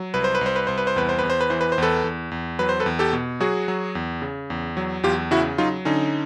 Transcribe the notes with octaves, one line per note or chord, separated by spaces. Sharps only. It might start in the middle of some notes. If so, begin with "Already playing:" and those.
Already playing: F#3
C2 B4
C5
B4
C2 C5
B4
C2 C5
B4
C5
E2 B4
C5
E2 B4
C5
B4
E3 C5
B4
C5
E2 A4 B4
E2
E2
F#3 B4
C5
A4 B4
E2
G4 A4
B2
F#3 F#4 G#4
F#3
E2
C#3
E2
F#3
E2 F4 G4
C#3 E4 F#4
F#3 D#4 F4
D3 C#4 D#4